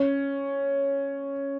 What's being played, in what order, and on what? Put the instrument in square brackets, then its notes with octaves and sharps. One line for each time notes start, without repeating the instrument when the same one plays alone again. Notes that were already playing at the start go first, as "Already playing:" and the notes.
Already playing: [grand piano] C#4